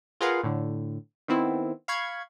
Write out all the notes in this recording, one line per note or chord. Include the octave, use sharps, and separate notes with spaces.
F4 G#4 A#4 B4 F5 F#5
A2 D3
D#3 B3 C4 E4
F5 B5 C#6 G#6